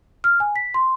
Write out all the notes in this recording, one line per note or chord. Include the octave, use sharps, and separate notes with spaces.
F6
G#5
B6
C6